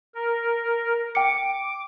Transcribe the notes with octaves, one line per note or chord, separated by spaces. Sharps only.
A#4
G5 D6 C#7